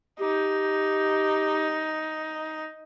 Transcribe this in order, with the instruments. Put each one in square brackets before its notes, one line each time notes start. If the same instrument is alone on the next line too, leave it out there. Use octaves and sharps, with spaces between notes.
[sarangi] D#4 [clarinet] G4